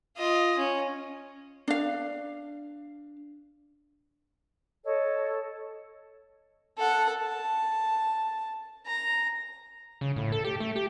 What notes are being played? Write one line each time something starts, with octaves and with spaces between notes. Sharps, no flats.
F4 D#5
C#4
D4 F5
A4 C#5 D#5
A4 F#5
A5
A#5
C#3
A2
A4
G4
A3
G4